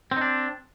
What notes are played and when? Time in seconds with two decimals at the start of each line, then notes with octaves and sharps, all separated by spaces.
0.11 C4
0.16 D#4
0.21 D4